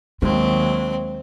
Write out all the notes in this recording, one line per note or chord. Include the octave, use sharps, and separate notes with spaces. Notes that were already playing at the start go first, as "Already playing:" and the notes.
D#2 F#3 G#3 C4